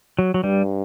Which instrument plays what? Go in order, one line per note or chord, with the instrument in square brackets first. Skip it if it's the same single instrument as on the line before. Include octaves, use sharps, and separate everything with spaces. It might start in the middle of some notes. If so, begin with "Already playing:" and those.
[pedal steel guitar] F#3
F#3
[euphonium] G2 [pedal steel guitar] G3